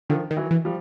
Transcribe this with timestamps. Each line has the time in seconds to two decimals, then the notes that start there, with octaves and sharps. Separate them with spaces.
0.09 D3 D#3 F3
0.31 D#3
0.37 E3 F#3
0.51 E3
0.65 F3 G3